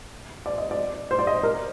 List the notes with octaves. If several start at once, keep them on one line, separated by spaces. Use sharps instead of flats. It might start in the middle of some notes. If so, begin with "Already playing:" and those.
D5
D#5
D5
C5
D5
D#5
A#4